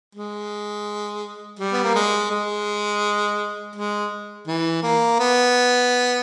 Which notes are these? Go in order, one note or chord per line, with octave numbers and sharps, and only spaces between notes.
G#3
G3
B3
A#3
G#3
G#3
G#3
E3
A#3
B3